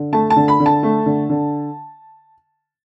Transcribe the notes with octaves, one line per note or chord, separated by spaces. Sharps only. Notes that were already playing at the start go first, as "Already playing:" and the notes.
Already playing: D3
A3 A5
A5
D3
B5
D3
A5
A3
D3
D3